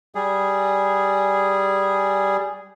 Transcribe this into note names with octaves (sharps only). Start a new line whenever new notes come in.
G3 G#4